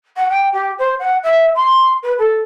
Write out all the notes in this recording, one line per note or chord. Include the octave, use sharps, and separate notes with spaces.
F#5
G5
G4
C5
F#5
E5
C6
B4
A4